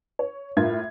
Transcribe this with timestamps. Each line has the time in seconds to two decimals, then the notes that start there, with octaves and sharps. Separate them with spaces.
0.19 C#5
0.57 A2 F4 A#4 G#6